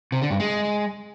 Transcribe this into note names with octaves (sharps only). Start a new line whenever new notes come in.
C3
D3
G2
G#3